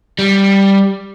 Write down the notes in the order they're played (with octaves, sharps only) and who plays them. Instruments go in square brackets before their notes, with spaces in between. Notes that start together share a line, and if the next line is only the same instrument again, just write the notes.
[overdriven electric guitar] G3